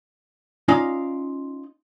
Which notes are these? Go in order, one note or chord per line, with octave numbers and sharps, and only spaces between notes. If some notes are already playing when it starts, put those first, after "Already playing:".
C#4 D#4 F4 D5 D#5 F5